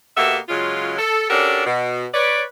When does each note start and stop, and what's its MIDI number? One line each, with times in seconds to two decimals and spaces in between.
0.17 0.38 47
0.17 0.38 58
0.17 0.38 59
0.17 0.38 67
0.17 0.38 69
0.17 0.38 76
0.48 0.93 49
0.48 0.93 54
0.48 0.93 56
0.48 0.93 65
0.98 1.25 69
1.30 1.62 61
1.30 1.62 62
1.30 1.62 66
1.30 1.62 67
1.30 1.62 69
1.30 1.62 70
1.66 2.06 47
2.14 2.43 71
2.14 2.43 73
2.14 2.43 74